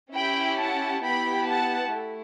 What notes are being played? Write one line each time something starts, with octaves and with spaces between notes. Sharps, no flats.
C#4 E4 G4 G5 B5
F#5 A5
B3 E4 G4 G5 B5
F#5 A5
A3 E4